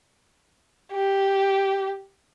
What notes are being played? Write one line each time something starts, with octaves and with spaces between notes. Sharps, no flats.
G4